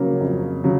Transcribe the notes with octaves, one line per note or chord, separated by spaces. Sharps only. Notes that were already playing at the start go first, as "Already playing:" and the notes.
Already playing: C#3 F#3 A#3 C#4
F2
C#3 F#3